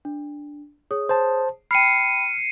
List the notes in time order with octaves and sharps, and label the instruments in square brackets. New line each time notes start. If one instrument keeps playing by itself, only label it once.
[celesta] D4
G#4 C#5 D#6
[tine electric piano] C5 A5
[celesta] G5 B5 [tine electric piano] F6 [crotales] C7 C#7 D#7